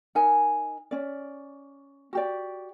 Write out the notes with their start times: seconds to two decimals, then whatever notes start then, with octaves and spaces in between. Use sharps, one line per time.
0.15 D#4 A#4 G#5
0.91 C#4 D5
2.13 F#4 G4 D5